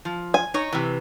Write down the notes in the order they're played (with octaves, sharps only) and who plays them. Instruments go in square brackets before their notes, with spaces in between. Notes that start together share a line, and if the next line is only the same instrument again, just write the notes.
[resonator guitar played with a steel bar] F3
[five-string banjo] G#5
[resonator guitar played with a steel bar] D#4 C#5
C3 E3